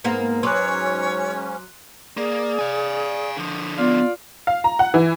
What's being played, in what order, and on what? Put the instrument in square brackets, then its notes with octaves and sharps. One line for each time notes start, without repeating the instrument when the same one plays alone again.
[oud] G#2 A#3 B3
[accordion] G#2 C#4 [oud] F#3 B4 [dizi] C#5 [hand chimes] C6 D6 F#6
[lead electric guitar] A#3 [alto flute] G#4 [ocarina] D5
[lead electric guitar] F5 G#5
D3 F3
[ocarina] B3 [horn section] F4 D5
[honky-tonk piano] F5
A#5
F#5
E3